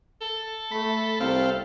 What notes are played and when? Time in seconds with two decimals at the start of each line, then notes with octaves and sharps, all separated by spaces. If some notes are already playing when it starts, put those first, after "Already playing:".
0.21 A4
0.71 A3 B5
1.20 C2 C4 F5